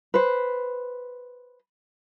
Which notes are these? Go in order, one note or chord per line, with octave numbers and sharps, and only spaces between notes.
B4 C5